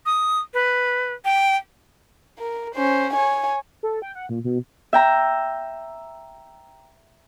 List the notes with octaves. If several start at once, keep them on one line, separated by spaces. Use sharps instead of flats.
D#6
B4
G5
A#4
C#4 C5
C#5 G#5
A4
G5
F#5
A#2
B2
E5 G5 A#5